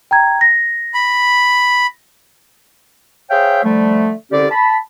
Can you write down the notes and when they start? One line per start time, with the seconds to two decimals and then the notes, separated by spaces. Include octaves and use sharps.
0.11 G5 A#5 G#6
0.41 A#6
0.94 B5
3.31 G#4 C5 C#5 E5 F5 G5
3.64 D3 F3 G3 A3
4.32 C2 D3 C#4 G4 D5
4.50 A5 B5